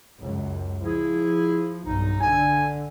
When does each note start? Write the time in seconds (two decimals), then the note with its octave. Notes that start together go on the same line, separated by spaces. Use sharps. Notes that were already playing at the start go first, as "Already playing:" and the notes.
0.20 C#2 F#2
0.83 F3 E4 G#4
1.85 B1 G2 D#4
2.20 D3 G#5